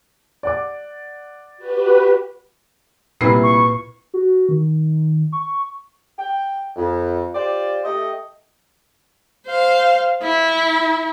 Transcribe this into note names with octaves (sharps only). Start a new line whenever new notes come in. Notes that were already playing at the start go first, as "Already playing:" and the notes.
D5 F#5 D6
F#4 G4 B4
C2 A#2 E4 B4 C7
C#6
F#4
D#3
C#6
G5
F2
F4 G4 C5 D5
A3 G4 D#5
C5 F5
E4